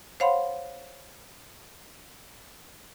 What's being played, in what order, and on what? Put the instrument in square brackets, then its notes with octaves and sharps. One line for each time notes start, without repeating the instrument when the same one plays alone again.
[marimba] C5 C#5 F5 F#5 B5 C6